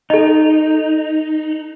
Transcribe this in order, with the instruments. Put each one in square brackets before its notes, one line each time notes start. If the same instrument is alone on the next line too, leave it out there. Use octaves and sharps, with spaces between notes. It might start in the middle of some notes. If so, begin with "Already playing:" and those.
[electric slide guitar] D#4 [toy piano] A4 D#5